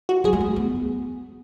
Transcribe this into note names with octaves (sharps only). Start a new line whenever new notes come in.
F#4
F#3 G#4
G#3
A3
B3